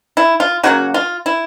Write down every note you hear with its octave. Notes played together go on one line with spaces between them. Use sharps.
E4
F4
C#3 F#3 A#3 F#4
F4
E4